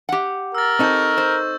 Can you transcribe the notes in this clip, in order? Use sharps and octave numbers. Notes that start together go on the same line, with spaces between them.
G4 F#5
A#4 E6 A6
C4 D#4 A4 C#6 G6
C5